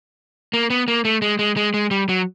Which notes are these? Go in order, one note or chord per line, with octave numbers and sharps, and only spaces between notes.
A#3
B3
A#3
A3
G#3
G#3
G#3
G#3
G3
F#3